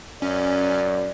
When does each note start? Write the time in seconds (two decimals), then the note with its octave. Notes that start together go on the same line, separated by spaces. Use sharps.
0.22 F#2 C#4 D5